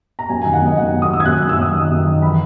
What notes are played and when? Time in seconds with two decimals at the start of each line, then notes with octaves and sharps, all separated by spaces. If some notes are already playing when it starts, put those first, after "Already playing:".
0.19 A#5
0.30 F#2 G#5
0.42 D#3 G#5
0.53 F#5
0.62 F#2 D#5
0.77 D#3 F#5
0.94 F#2
1.02 D#6
1.10 D#3 E6
1.20 G#6
1.25 F#2 F#6
1.38 D#3 F#6
1.49 E6
1.58 F#2 D#6
1.74 D#3
1.90 F#2
2.06 D#3
2.22 E3 B5